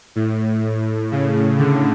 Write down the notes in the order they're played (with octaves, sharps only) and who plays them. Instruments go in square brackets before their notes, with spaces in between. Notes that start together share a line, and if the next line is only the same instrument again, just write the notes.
[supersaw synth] A2
C#3
D3